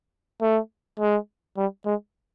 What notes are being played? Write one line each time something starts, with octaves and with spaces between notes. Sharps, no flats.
A3
G#3
G3
G#3